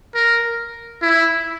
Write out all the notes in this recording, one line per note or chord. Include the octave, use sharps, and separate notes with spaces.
A#4
E4